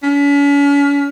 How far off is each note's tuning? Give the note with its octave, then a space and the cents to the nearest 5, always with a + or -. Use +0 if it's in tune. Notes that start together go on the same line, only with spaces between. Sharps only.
C#4 +40